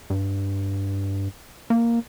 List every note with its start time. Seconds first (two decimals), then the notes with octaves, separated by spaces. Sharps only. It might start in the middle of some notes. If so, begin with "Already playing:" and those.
0.10 G2
1.70 A#3